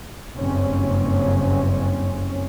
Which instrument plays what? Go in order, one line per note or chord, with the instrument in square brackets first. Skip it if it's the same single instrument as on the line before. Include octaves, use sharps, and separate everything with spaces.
[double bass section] F#1 G2 C4 C#4